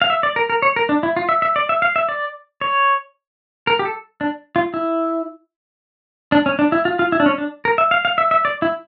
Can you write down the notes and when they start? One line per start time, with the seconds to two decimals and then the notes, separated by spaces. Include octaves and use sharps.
0.02 F5
0.10 E5
0.23 D5
0.36 A#4
0.50 A#4
0.62 C#5
0.76 A#4
0.89 D4
1.03 E4
1.16 F4
1.29 E5
1.42 E5
1.56 D5
1.69 E5
1.82 F5
1.96 E5
2.09 D5
2.61 C#5
3.67 A#4
3.79 G4
3.85 A4
4.21 D4
4.56 F4
4.74 E4
6.32 D4
6.46 C#4
6.59 D4
6.72 E4
6.85 F4
6.99 F4
7.12 E4
7.20 D4
7.26 C#4
7.38 D4
7.65 A#4
7.78 E5
7.91 F5
8.05 F5
8.18 E5
8.31 E5
8.45 D5
8.62 E4